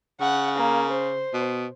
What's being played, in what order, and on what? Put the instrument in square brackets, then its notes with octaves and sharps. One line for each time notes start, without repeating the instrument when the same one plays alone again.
[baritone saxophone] C#3 [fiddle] F#5
[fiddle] A#3
C5
[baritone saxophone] B2